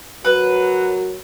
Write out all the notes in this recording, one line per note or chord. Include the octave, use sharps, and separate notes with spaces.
F#3 A#4 B4